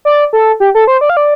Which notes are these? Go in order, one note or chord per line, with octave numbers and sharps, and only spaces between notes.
D5
A4
G4
A4
C5
D5
F5
D5